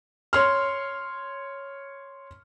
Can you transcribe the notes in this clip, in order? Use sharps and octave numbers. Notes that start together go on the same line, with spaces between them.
C#5 C6 F6